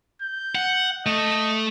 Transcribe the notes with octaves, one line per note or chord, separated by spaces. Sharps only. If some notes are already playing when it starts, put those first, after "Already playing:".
G6
F#5
A3 D#5